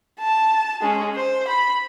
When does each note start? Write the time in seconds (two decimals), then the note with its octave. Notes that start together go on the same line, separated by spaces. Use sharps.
0.19 A5
0.82 G#3 C#4
1.15 C5
1.48 B5